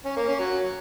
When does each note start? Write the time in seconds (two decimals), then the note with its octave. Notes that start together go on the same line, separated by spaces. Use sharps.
0.05 C#4
0.16 A#3
0.28 C#4
0.39 F#3